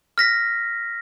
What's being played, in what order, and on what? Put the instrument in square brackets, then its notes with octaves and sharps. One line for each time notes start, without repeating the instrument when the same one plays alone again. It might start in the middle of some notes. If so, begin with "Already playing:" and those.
[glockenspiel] F6 A#6 B6